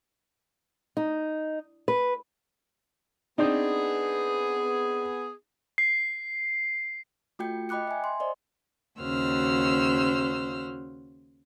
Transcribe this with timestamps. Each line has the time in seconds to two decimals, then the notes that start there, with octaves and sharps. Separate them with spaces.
0.97 D#4
1.88 B4
3.38 B3 C4 D4 D#4 G#4
5.78 C7
7.39 A3 F4 F#4 G5 G6 C#7
7.69 D#5 G5 B5 D6 F#6 C#7
7.87 E5 G#5
8.04 C6
8.20 C5 D5 D#5
9.01 D#2 C#3 F#4 C5 E6 F6